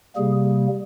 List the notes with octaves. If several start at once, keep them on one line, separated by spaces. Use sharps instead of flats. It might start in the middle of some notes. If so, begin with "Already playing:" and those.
C3 G3 A#3 G#4